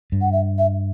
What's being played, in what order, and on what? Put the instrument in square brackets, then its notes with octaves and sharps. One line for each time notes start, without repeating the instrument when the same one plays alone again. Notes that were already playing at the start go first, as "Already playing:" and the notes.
[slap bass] G2
[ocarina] F#5
E5
E5